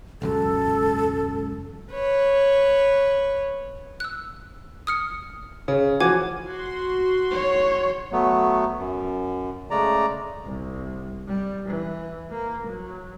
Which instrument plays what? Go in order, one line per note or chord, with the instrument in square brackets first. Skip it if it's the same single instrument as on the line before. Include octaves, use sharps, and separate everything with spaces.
[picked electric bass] E1 C#2 F#2 [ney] A4
[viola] B4 C#5
[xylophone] E6 F#6
D#6 F6 C#7
[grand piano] C#3
[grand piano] E3 F3 F#4 [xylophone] G#5 D6 G#6
[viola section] F#4 C6
[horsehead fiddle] C#5
[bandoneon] F#3 A3 B3
F#2
C#3 G#3 A3 D5 A#5
[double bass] C2
G3
E3
A#3
F#3